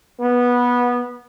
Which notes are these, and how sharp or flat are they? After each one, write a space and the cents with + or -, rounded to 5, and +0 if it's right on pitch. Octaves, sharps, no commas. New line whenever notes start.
B3 -15